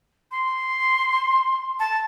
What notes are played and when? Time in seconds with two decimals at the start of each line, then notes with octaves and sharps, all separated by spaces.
0.31 C6
1.79 A5